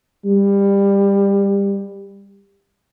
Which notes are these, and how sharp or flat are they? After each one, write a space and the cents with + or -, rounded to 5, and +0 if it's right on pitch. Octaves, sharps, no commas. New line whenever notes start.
G3 +20